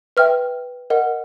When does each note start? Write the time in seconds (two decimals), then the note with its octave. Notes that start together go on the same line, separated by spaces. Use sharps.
0.17 B4 E5 G5 F6
0.90 A#4 D#5 F#5